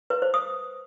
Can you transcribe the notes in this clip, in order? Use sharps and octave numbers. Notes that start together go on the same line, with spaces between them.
B4
C5
D#6